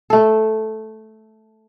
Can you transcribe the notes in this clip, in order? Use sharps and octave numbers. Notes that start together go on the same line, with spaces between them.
A3 A4